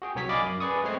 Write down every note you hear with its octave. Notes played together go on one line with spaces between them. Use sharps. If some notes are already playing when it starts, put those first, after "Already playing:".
F#4 G#4 G5
C2 F#3 C#5 B6
D5 D#5 F5 G#5 B5 D6
F#2
G#4 B4 D5 C#6 D#6
G#3 A3 C4 C#5 C7